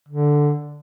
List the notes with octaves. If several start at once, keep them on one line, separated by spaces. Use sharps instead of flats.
D3